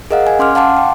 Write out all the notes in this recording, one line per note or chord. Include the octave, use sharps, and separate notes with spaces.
G#4 A#4 D#5 F5 F#5
G#5
C#4 C6 D6 F6
F5 F#5 A5 C6 D6
G5